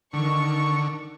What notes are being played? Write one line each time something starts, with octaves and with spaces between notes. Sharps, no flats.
D3 D#3 C#6